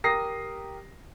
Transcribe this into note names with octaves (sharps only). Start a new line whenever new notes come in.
G4 A#4 D#6 A#6 C7